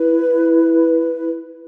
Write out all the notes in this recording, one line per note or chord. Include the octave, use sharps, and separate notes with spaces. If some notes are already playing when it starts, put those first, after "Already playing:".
Already playing: E4 B4